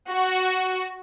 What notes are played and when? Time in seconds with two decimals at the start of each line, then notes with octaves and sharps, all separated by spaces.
0.11 F#4